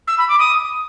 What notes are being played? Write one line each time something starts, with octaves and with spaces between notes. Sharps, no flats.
E6
B5
D6
D#6